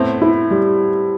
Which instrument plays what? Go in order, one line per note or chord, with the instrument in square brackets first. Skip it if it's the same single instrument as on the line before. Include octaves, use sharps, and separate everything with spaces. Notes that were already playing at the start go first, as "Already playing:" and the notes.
Already playing: [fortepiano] A2 A3 [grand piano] B3 C4
[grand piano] E4
G3